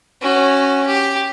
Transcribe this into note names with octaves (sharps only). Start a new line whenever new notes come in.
C#4 F#4
G4